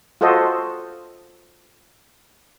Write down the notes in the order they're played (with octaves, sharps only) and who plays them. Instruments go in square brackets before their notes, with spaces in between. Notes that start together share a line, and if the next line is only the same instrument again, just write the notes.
[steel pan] F4 F#4 A4 C5 D#5